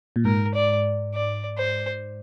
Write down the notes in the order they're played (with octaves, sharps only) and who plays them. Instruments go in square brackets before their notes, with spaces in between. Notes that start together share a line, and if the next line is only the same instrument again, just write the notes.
[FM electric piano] A#2
[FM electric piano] G#2 [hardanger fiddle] A#4
[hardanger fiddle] D5
D5
C5